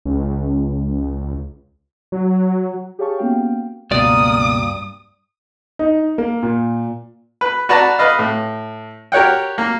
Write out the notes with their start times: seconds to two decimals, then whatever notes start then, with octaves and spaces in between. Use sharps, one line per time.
0.05 C#2
2.12 F#3
2.99 G4 G#4 C#5 F5 A5 C#6
3.18 A#3 B3 C#4 F#4 F5 G5
3.91 C#2 G2 B2 A#3 D5 D#6
5.79 D#4
6.18 A#3
6.43 A#2
7.41 B4
7.69 F#4 B4 D5 A5 A#5
7.99 B4 D#5 F5
8.19 A2
9.12 G4 A#4 C#5 F#5 G5
9.58 A#3